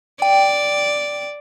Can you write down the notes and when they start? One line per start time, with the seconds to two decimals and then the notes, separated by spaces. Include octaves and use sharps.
0.22 D5 G5